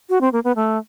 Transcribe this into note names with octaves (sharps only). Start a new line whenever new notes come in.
F#4
C4
A#3
B3
A3